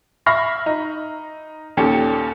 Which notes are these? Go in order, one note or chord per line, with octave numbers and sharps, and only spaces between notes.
E5 B5 C#6 F6 A#6 C7
D#4
D#2 A#2 C#4 G4 A4 C#7